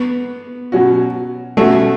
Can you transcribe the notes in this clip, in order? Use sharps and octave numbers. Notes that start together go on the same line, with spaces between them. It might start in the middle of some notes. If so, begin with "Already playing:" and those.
Already playing: B3
B2 F#3 C#4 F#4
B2 F#3 A3 C#4 F#4